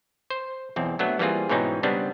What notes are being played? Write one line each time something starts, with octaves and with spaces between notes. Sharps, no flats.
C5
B1 E2 C4
F#3 A3 B3 D4
E3 G3 A#3 C4 F4 G#4
G#2 B2 E3 C4 C#4 D#4
C#3 G3 B3 C4 D4